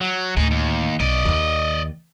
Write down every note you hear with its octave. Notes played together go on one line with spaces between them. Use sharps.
F#3
D2 A2 D#4 G#4
D#2
B1 D5 D#5
D#2 D#3